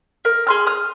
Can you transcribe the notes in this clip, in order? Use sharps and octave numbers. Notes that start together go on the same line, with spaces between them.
A#4
G#4 C6 F6
D#6 F6